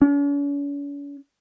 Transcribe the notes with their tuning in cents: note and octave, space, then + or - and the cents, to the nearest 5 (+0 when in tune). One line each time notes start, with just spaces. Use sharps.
C#4 +45